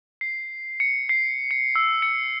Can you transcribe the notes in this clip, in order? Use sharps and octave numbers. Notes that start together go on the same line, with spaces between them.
C7
C#7
C7
C#7
E6
C#7